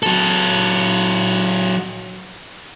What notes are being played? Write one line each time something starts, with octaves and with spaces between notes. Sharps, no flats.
F#3 A4